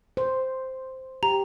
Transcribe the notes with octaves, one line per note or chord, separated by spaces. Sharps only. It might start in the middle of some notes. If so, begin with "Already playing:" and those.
C5
G4 A#5